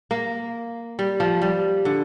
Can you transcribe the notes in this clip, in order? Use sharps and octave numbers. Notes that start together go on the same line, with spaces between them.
A#3
G3
F3
G3
D3